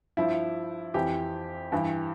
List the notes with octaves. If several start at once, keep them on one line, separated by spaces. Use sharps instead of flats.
G2 F3 E4
F2 E3 G4
G2 E3